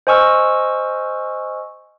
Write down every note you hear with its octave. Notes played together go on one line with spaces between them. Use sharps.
C5 D#5 G#5 C#6 E6 F6